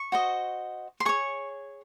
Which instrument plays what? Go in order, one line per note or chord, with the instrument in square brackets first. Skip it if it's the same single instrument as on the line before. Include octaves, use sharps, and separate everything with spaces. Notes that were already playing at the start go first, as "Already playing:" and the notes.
Already playing: [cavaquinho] C#6
F#4 C5 D#5
C6
G#4 C#5 C#6